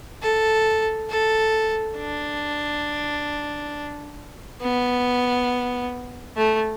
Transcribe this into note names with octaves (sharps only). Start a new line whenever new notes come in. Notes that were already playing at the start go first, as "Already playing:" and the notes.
A4
A4
D4
B3
A3